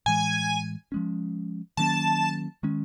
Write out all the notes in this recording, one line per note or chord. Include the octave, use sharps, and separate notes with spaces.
A2 E3 G#3 G#5
F3 G#3 C#4
D#3 F#3 A#3 C#4 A5
D#3 G#3 C#4